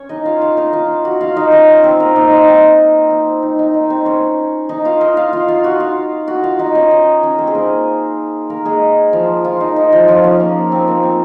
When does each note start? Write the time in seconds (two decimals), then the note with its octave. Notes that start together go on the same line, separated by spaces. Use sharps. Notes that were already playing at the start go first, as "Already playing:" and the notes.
Already playing: C#4 C#5
0.09 D#4 D#5
0.25 F4 F5
0.41 F4 F5
0.57 D#4 D#5
0.73 F4 F5
1.05 F#4 F#5
1.21 F4 F5
1.37 D#4 D#5
1.52 C#4 C#5
1.84 C4 C5
2.00 A#3 A#4
2.16 D#4
2.31 D#4
2.47 C4
3.11 C4
3.42 D#4
3.59 D#4
3.74 D#4
3.90 C4 C5
4.06 C#4 C#5
4.69 D#4 D#5
4.85 F4 F5
5.01 D#4 D#5
5.17 F4 F5
5.33 F4 F5
5.48 F4 F5
5.64 F#4 F#5
5.80 F4 F5
6.27 F#4 F#5
6.44 F4 F5
6.59 D#4 D#5
6.75 C#4 C#5
6.91 D#4 D#5
7.23 C#4 C#5
7.39 C4 C5
7.47 G#4
7.55 A#3 A#4
8.50 A#3 A#4
8.65 G#3 G#4
9.13 F3 F4
9.45 F3 F4
9.61 D#4
9.76 D#4
9.92 F3 F4
10.08 F3 F4
10.24 C#4
10.40 A#3
10.72 C4
10.88 A#3
11.03 C4